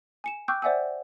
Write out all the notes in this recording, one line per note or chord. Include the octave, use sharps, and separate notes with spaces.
G#5 C#7 E7
G5 C#6 D6 E6 F#6 G6
C5 D5 E5 F#5 G#5 E6